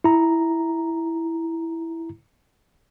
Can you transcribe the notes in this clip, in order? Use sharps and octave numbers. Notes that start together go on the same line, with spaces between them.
E4 A#5